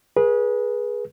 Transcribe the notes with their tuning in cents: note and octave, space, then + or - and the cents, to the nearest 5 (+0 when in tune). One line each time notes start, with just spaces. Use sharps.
G#4 +0 B4 -30